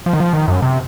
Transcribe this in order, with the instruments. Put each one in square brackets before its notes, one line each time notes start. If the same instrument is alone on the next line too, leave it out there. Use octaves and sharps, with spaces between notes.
[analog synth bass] F3
D#3
F3
D#3
F#2
C3